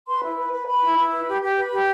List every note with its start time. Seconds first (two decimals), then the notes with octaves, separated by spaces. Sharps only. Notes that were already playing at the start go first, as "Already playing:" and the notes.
0.08 B4 C6
0.23 E4
0.38 B4
0.52 B4
0.67 B4 B5
0.82 E4
0.97 E4
1.12 B4
1.27 G4
1.41 G4
1.57 B4
1.72 G4